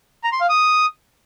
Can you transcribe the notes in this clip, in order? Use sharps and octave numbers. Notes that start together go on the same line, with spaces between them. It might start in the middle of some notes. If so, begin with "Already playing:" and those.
A#5
C6
F5
D#6